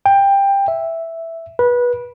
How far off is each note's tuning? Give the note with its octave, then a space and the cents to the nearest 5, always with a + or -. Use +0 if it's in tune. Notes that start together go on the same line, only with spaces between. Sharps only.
G5 +15
E5 +0
B4 -20